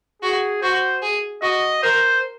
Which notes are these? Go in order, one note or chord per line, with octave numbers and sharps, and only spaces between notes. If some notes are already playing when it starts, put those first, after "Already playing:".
F#4 G#4
F#4 C5
G#4
F#4 D#5
A#4 C5